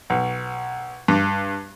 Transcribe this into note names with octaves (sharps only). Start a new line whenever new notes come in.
B1
G2